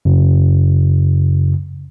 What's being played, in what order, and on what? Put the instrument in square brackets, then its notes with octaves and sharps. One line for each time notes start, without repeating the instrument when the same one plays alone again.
[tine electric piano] F#2 C#3